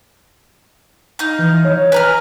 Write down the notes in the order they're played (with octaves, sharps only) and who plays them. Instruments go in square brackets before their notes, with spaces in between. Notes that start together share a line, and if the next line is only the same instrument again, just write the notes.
[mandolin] D#4 F5
[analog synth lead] E3
C#5
[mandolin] B4 A#5 F6 [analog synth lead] G#5